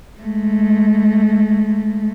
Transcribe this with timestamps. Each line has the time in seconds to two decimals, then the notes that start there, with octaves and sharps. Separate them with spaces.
0.20 G#3 A3